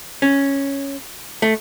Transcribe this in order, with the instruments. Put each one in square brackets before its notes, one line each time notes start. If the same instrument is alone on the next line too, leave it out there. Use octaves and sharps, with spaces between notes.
[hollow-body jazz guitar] C#4
A3